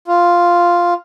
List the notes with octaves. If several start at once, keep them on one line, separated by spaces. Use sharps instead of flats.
F4